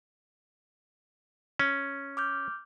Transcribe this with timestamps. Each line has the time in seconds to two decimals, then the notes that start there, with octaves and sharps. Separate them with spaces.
1.59 C#4
2.17 D6 F6 G6